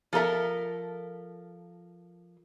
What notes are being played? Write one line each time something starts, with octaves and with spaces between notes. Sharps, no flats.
F3 A4 A#4 E5